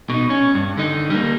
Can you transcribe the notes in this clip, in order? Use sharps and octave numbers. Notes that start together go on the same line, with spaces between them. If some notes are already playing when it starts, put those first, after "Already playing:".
B2 D#4
C#4
G2
D3 D#4
G3 A#3